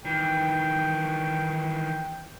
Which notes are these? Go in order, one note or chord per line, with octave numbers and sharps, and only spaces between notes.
D#3 E3 G5